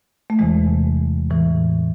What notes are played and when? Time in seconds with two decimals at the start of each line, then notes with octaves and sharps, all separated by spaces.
0.30 A3
0.39 E2 C3 E3 G#3
1.30 A2 E3